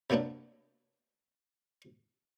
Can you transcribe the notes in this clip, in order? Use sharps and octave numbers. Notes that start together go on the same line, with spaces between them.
C3 F#3 A#3 B3 D4